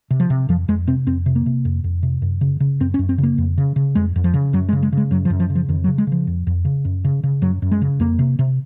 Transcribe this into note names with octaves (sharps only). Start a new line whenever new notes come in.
C3
F3
C3
F2 F3
F2 G#3
C3 C4
F2 C4
C3
A#3
C3
F2
F2
C3
F#2
C#3
C#3
F#2 C4
C#4
F#2
C4
C#3
A#3
F2
C#3
C#3
F2 G#3
F2
F3
C#3
F#2 F#3
G#3
C#3
G#3
C#3
G#3
F#2 F#3
F3
F#2
F3
C#3
F3
F2 D#3
F#3
C#3
G#3
C#3 F3
F2
F2
C#3
F#2
C#3
C#3
F#2 F#3
F#2
G#3
C#3
F2 A#3
C3
C3